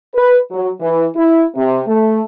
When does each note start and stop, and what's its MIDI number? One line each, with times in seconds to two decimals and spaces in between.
0.15 0.37 71
0.51 0.69 54
0.81 1.05 52
1.16 1.45 64
1.55 1.81 48
1.87 2.22 57